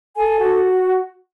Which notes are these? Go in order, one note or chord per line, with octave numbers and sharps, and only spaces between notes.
A4 G#5
F#4